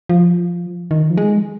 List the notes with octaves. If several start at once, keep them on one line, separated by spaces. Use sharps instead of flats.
F3
D#3
F3
G#3